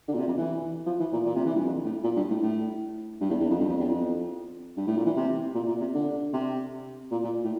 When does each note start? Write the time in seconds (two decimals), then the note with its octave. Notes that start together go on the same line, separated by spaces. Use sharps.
0.08 D3
0.14 A#2
0.18 C3
0.27 F2
0.37 E3
0.86 F3
1.00 E3
1.12 A#2
1.26 A#2
1.35 C3
1.45 E3
1.55 G2
1.65 F2
1.84 A2
2.04 A#2
2.16 G2
2.30 A2
2.42 A2
3.21 G2
3.30 E2
3.40 E2
3.50 F2
3.60 G2
3.69 F2
3.79 E2
3.89 F2
4.77 G2
4.87 A2
4.97 A#2
5.06 E3
5.16 C3
5.54 A#2
5.68 A#2
5.81 C3
5.94 D3
6.33 C3
7.11 A#2
7.24 A#2
7.43 A2